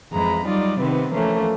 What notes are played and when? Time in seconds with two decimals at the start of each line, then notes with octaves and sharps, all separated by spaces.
0.12 F2 E3 G#3 A#5 B5
0.45 F#3 G3 D#4 F4 D5
0.78 C3 D#3 B3 C4 B4
1.13 E3 F3 A3 A#3 C#4